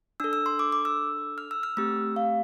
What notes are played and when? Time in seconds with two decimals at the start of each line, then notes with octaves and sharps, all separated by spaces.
0.20 D4 A4 E6
0.33 E6
0.46 C6
0.59 D6
0.72 D6
0.85 E6
1.38 F6
1.51 E6
1.63 F6
1.77 A3 C4 G4 E6
2.16 F5